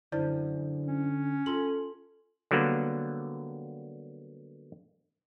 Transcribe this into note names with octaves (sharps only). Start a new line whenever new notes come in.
F#2 D3 E4 C5 D5
C#4
F4 A4 C6 F#7
D3 F#3 G3 A#3 B3